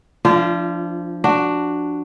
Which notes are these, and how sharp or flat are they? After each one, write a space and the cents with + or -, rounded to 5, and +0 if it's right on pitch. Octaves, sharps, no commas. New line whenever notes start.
F3 +0 D4 +0 F4 -35
D4 +0 F#4 +0